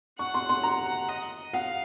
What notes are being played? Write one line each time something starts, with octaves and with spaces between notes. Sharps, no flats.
F#5 C#6
C6
C6
A#5
D#5
F5 F#5